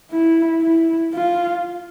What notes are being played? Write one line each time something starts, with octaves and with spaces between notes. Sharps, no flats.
E4
E4
F4